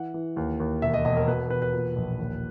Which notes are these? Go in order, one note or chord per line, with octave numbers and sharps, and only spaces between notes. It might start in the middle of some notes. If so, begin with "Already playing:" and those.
Already playing: E3 F#5
E3
D#2
D#2
E1 E5
D#5
E1 D#5
A#4
B2 B4
E1 B4
B4
A#2
A#1
D#2